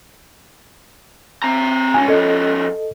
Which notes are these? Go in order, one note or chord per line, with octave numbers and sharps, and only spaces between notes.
C4 A#5
C#2 C#4 G#5
F3 C#4 A4 D#5